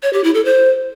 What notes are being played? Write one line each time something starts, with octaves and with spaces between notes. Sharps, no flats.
C#5
G4
E4
A4
C5